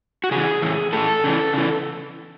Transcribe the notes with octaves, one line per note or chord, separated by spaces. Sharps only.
F#4
C#3 E3 G#4
A2 E3
A2 E3 A4
C#3 E3
C#3 E3